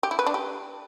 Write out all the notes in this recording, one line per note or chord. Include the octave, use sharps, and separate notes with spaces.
G4
E4
B4
D4
G4